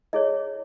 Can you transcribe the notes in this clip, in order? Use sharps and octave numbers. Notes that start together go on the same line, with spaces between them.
E4 G#4 C#5 D#5